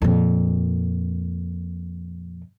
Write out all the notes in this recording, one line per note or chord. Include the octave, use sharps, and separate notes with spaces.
F2 A#2